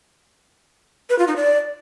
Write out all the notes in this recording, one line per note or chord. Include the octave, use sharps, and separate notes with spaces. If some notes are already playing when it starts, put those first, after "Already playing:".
B4
F4
D#4
D5